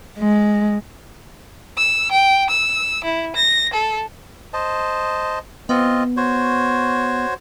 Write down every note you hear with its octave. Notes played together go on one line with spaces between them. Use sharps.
G#3
E6
G5
E6
E4
A#6
A4
C5 D#5 A5
B3 C4 F4 D#5
F#4 C5 C#5